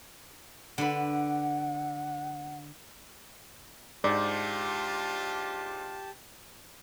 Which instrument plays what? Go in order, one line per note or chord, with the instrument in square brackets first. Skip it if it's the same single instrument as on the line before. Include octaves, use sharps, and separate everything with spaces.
[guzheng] D3 B4 [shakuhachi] F#5
[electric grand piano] G#2 [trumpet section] D4 F4 [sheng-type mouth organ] G4 A5 [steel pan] D5